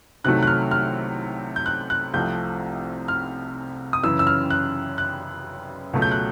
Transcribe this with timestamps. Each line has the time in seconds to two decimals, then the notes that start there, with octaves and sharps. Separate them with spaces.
0.24 C2 C3 D#3 F#3 A3 F#6
0.43 F#6
0.47 F6
0.71 F6
1.56 G6
1.66 F#6
1.90 F#6
2.13 C2 C3 F3 A3 C4 G6
3.08 F6
3.93 D#6
4.03 F#2 C#3 E3 E6
4.19 E6
4.27 F6
4.50 F#6
4.98 F#6
5.93 C#2 B2 F#3 A3
6.02 G6
6.12 F#6